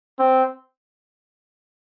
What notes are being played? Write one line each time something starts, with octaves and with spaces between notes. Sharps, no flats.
C4